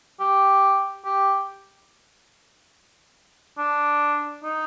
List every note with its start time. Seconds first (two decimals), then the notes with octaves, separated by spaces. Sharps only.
0.20 G4
1.05 G4
3.58 D4
4.43 D#4